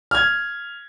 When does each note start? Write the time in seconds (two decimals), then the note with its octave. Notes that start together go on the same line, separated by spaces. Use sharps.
0.11 F6 G#6